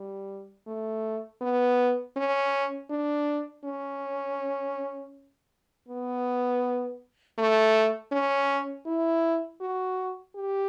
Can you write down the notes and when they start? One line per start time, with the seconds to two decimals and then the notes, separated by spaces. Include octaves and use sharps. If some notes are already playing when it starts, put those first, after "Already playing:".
Already playing: G3
0.67 A3
1.41 B3
2.17 C#4
2.90 D4
3.65 C#4
5.89 B3
7.38 A3
8.12 C#4
8.86 E4
9.61 F#4
10.36 G4